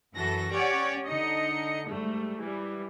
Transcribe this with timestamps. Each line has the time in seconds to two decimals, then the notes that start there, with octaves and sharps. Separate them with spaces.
0.13 F#2 E3 F#4 A4 A#6
0.49 C#4 G4 C#5 D5 F#5
1.05 D3 D#4 D#5 C#7
1.89 G#2 G3 A3
2.39 E3 G3